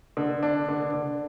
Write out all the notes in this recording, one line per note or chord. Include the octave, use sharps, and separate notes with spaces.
D3
D4
D3
D3